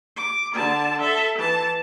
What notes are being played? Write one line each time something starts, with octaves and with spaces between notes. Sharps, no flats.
D6
D3 A5
A4 E5
E3 A5